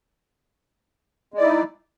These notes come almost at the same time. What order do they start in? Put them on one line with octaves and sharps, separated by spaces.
G#3 D5 E4 D#4